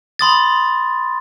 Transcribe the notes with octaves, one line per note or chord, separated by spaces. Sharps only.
B5 C6 D#6 A6